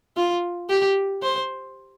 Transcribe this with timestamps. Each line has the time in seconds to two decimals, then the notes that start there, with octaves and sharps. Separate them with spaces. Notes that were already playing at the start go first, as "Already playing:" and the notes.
0.17 F4
0.69 G4
1.22 C5